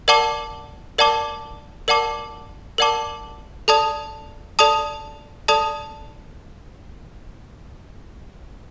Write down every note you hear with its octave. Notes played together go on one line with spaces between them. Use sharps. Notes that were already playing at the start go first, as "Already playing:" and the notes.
A#4 D5 F#5 A5 D6
A#4 D5 F#5 A5 D6
A#4 D5 F#5 A5 D6
A#4 D5 F#5 A5 D6
A4 D5 A5 D#6
A4 D5 A5 D#6
A4 D5 A5 D#6